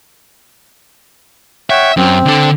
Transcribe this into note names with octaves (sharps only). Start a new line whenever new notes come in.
C#5 E5 F#5 G5
F#2 C4
D3 A4